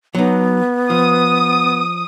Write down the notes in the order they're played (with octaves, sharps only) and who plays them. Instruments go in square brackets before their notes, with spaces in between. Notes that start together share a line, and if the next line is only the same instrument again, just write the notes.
[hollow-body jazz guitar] F#3 D#4 [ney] B3
[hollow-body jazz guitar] F3 [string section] D#6